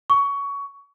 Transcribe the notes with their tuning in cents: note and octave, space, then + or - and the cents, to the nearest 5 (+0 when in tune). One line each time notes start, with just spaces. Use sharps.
C#6 +20